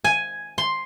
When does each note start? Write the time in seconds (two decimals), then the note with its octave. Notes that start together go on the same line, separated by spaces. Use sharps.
0.04 G#5
0.58 C6